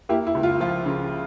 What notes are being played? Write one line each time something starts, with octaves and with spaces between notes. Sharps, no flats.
A#3 E4 G4
E4
C#2
F4
F3 F4
C#3